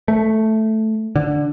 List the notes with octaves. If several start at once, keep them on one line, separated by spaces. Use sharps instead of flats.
A3
D3